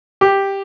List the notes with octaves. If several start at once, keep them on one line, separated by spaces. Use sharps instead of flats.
G4